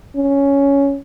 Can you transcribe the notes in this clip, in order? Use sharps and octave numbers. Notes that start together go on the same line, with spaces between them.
C#4